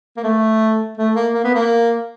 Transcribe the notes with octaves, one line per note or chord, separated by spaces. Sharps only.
A#3
A3
A3
A#3
A#3
B3
A#3